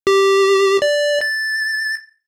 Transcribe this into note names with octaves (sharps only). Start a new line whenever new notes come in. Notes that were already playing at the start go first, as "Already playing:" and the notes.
G4
D5
A6